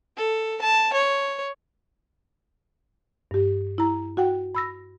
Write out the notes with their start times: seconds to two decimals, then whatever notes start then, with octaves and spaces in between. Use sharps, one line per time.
0.17 A4
0.61 A5
0.93 C#5
3.31 G2 G4
3.78 E4 A#5
4.17 F#4 F#5 G5
4.55 B5 E6 A#6